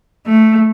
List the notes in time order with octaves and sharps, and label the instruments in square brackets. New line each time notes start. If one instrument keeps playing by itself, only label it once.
[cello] A3